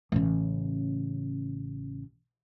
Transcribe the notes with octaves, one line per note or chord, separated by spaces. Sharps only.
A1 C#3